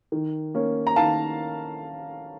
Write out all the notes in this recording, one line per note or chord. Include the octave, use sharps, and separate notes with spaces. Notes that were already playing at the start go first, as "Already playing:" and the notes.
D#3
A#3 C#4
A#5
D#3 F5 A5